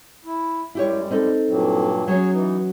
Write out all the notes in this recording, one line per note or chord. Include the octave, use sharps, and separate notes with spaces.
E4
F#2 G3 G#3 E4 G4 C#5
C4 D#4 A4
G2 A#2 F#3
F#3 A#3 C#4 G#4 C#5
E3 D#4